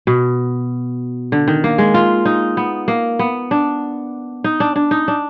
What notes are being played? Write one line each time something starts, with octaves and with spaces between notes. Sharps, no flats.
B2
D3
D#3
A#3
G#3
F4
D#4
B3
A#3
B3
D4
D#4
D4
D4
D#4
D4